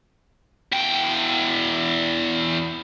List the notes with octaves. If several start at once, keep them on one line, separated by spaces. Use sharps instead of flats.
E2 G5